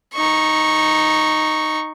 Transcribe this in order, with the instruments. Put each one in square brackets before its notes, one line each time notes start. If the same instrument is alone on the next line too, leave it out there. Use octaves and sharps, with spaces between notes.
[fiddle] D#4 C#6